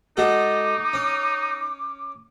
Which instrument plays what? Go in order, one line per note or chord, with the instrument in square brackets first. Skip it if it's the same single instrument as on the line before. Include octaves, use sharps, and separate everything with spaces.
[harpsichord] G#3 F#4 A4 [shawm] D#4 [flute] D6
[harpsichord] C#4